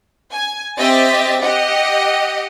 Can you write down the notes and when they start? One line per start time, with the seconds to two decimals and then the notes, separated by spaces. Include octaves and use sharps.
0.32 G#5
0.78 C4 G4 D#5 E5 A6 B6
1.41 G4 D#5 F#5